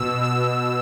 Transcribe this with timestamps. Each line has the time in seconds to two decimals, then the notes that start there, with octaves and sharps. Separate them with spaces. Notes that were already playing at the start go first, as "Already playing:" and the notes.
Already playing: B2 E6
0.23 E6